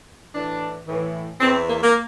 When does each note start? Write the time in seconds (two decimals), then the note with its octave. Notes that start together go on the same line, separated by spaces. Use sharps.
0.34 A2 E3 D4
0.87 A2 E3
1.41 E2 E3 C4
1.67 A#3
1.83 A#3